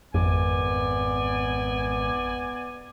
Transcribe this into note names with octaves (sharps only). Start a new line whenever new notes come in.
G#1 F2 B3 D5 G#5